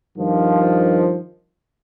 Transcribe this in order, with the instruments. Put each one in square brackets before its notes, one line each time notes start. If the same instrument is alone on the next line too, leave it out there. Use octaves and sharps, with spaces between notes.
[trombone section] G2 D#3 F3